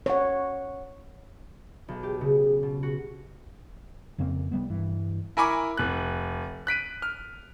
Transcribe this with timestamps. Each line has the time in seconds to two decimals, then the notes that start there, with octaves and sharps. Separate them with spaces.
0.06 C#5 F#5
1.88 B1
2.03 G4
2.21 C#3
2.63 B2
2.83 F#4
4.18 F2 C#3 A#3 C4
4.51 C2 G3 B3
4.70 G2 E3
5.37 E4 A#4 G#5 B5 C#6 D6
5.77 F1 F#6
6.67 F#6 B6 D7 D#7
7.02 F6